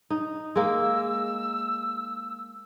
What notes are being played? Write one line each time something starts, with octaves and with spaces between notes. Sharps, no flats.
D#4
G#3 A#3 E6